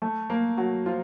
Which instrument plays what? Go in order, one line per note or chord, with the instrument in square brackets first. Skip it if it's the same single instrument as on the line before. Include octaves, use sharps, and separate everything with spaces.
[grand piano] A3 A4
A#3 A#4
F#3 F#4
F3 F4